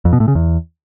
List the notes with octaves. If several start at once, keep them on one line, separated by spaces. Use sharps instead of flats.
F2
B2
A2
C#3
E2